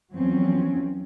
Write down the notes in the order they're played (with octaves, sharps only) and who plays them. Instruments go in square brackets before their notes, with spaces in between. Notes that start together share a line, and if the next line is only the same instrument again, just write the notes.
[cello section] E2 F3 F#3 C4 C#4